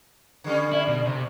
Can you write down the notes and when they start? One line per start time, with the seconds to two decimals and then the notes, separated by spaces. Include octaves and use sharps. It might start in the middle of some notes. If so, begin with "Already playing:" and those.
0.44 D3 G3 C#4
0.73 E4
0.88 B2
1.06 C3